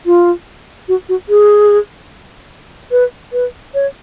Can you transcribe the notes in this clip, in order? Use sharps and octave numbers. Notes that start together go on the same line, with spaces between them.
F4
F#4
F#4
G#4
B4
B4
C#5